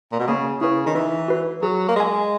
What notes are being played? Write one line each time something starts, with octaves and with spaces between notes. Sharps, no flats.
A#2
B2
C#3 A#3
C#3 E4 B4
D#3
E3 D#4
F#4 B4
F#3 G#4
A#3
G#3 D#5 G#5